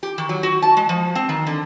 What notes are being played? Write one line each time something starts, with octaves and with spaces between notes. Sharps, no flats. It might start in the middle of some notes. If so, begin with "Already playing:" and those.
G4
D#3
F#3
F#4
A5
G#3
F3
C4
D#3
D3